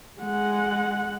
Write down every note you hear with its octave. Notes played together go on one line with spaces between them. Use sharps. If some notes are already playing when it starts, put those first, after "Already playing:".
G#3 F#5